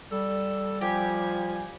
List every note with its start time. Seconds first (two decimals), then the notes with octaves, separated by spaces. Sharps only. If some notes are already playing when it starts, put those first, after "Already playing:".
0.12 G3 A4 D5
0.81 F3 G4 G#5